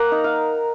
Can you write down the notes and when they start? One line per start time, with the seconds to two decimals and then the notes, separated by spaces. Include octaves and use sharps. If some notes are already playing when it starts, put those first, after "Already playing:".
Already playing: A#3 A#4 F#5 A#5
0.11 D#4
0.24 F5